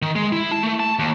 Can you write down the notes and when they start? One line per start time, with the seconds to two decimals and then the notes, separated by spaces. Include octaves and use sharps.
0.02 D#3
0.16 G#3
0.32 E4
0.51 A5
0.63 A3
0.80 A5
0.99 D#2